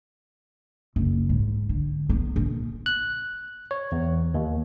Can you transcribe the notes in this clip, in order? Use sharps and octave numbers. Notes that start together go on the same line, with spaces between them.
F#1
G#2
D3
B3
A#1
F#6
C#5
E2
D#2